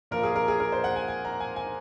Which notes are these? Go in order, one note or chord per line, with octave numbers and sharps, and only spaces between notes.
A#2 F3 A#4
G#4
A#4
G#4
A#4
C5
F#5
G#5
G#5
A#5
G#5
G#5